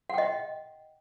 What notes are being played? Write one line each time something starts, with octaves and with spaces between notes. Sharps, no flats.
D#5 F#5 G5